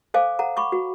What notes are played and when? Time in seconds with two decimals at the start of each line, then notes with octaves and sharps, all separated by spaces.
0.14 A4 C5 F5 G#5 D6
0.39 A4 F#5 A#5
0.57 B5 C#6 D6
0.72 F#4